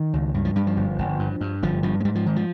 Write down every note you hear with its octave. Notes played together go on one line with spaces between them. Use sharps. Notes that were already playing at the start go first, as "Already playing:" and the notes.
Already playing: D#3
C#2
G2
F3
G2 G3
F3
G1
G1
G2
G2
G1 F3
G2 F3
G#3
G#2 G3
F3
G#2 D#3
F3